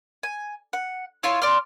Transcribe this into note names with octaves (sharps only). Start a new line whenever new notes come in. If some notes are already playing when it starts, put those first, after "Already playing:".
G#5
F#5
E4 F4 C#5 C6
D5 C6 F6